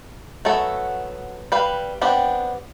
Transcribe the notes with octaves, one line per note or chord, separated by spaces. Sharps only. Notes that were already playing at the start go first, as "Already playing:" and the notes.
F#3 A3 B3 A4
G3 B4 F5
B3 C4 D4 G4